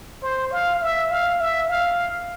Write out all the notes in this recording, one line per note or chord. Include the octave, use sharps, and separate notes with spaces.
C5
F5
E5
F5
E5
F5